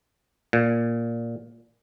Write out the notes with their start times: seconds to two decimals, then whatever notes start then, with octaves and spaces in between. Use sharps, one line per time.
0.53 A#2